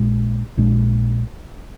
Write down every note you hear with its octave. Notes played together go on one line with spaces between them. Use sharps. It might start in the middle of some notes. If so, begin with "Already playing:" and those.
Already playing: A#1 A#2 G#3 D4
A#1 A#2 G#3 D4